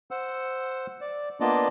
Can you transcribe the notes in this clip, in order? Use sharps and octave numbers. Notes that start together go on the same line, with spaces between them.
C5 F#5 E6
D5
A#3 B3 D4 F4 D5 D#5